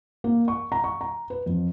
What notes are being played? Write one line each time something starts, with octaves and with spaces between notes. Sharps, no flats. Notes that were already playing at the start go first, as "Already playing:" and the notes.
A#3
C#6
A#5
C#6
A#5
B4
F2